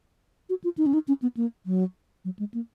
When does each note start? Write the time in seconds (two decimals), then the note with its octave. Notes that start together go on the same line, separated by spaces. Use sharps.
0.49 F#4
0.64 F4
0.78 D#4
0.86 C#4
0.94 D#4
1.08 C#4
1.22 B3
1.37 A#3
1.66 F#3
2.25 F#3
2.39 G#3
2.54 A#3